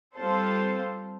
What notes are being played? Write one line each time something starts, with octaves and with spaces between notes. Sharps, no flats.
G3 C4 F4 A4 C5